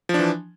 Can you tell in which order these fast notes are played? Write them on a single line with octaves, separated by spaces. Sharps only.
F3 D4 E3